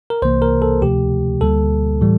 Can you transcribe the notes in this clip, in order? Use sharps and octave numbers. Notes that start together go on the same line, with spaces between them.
A#4
C2 C3 E3 A#3 C5
A#4
A4
D2 C3 F3 A3 G4
D2 D3 G3 A#3 A4
A2 E3 G3